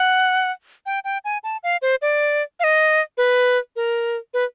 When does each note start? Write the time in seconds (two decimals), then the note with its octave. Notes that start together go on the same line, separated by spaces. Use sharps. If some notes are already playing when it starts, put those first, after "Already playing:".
Already playing: F#5
0.86 G5
1.04 G5
1.25 G#5
1.44 A5
1.63 F5
1.82 C5
2.02 D5
2.60 F5
2.64 D#5
3.18 B4
3.76 A#4
4.34 B4